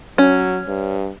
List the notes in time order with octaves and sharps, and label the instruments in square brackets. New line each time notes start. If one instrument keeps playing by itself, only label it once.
[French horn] F#3 [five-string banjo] C#4
[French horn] G2